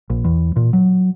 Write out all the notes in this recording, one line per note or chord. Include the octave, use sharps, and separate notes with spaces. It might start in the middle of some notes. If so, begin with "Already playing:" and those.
A#1
E2
A#2
F#3